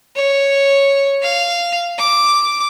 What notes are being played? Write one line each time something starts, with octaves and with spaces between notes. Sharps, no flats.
C#5
F5
D6